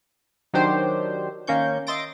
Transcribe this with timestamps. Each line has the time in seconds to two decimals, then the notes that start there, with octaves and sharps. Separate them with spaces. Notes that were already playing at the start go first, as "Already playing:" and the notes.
0.53 D#3 F#3 D4 G4 C5
1.47 D#3 A#3 C#4 C#6 G6
1.87 D#5 E5 C6 A6 A#6 D7